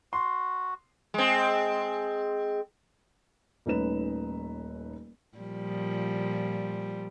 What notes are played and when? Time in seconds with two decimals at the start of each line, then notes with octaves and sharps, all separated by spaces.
0.13 F#4 C6
1.14 G#3 C4
3.66 D#1 A3 C#4 D#4 B4 E7
5.37 A#2 F3 G3